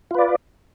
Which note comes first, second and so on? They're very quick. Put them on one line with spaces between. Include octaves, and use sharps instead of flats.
F4 B4 D5